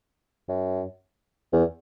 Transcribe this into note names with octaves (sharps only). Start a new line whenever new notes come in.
F#2
E2